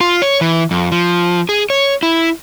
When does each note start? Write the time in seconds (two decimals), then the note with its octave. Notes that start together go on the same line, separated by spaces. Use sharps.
0.01 F4
0.22 C#5
0.41 E3
0.71 F2
0.92 F3
1.49 G#4
1.70 C#5
2.03 E4